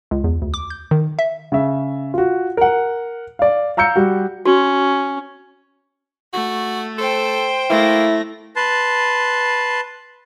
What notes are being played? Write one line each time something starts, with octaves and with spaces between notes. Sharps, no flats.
C#2
E2
D2
D6
G6
D#3
E5
C#3 E5
F4 F#4
A#4 F#5
D5 F5
F5 A#5 E6 G6 C#7
G3 F#4
C#4 F#4
A3 F#4
A4 C5 G5
A3 A#3 E4 A#6
B4 A5 C6